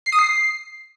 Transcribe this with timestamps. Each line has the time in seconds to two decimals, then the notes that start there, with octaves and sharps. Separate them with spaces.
0.06 C7
0.12 D#6
0.19 C7